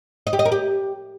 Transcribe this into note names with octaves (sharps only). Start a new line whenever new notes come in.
D#5
G4
D#5
A#4
G4